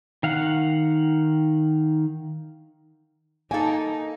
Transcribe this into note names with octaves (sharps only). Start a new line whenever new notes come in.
D#3 F5 F#5
A#3 D#4 A4 F5 G#5